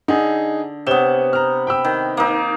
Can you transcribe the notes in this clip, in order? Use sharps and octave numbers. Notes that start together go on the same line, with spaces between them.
D3 D#4 G#4
C3 B3 C#5 E7 G7
A#5 F6
G5 B5 E6
D#3
A#3 D#4